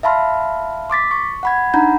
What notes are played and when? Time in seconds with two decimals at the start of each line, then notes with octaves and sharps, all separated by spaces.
0.03 E5 F5 A5 B5 C6 F6
0.90 C6 D6 A6 B6
1.11 C#6
1.43 F#5 B5 G#6
1.74 D4 D#4 F#5 A#5 B5 G6